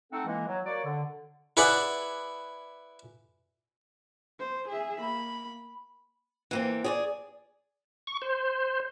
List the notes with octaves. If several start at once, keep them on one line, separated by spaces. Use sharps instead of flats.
A3 C4 D#4 A4 F#5
E3 G#3 A#3
F#3
A#3 F#4 C#5 D5
D3
E4 G#4 B4 D5 F#5
C5
G#4 E5
A#3 B5
E3 A#3 C4
G#4 C#5 D5
C#6
C5